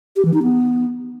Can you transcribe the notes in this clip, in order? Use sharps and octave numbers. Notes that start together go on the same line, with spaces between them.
G4
E3
D#4
B3